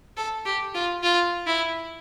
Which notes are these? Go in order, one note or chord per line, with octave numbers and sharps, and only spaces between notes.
A4
G4
F4
F4
E4